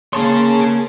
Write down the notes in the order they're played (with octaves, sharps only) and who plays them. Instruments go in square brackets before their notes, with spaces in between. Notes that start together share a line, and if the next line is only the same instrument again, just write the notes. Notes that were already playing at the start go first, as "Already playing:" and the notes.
[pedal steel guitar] A#3 A5 C6 [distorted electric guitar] G#4 C#5